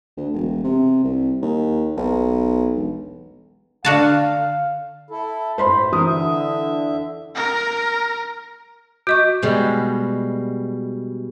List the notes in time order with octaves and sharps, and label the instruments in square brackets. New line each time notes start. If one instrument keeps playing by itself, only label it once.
[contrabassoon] D2
E1
C3
C2
D#2
B1
E1
[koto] D3 F#4 A5 [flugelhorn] F5
[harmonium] E4 A4
[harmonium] A2 [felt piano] C5 B5 C6
[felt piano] E3 D#6 [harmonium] A#4 C5
[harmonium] D3 E5
[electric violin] A#4
[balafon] F#4 D#5 C#6 [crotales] G6
[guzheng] B2 G3 G#3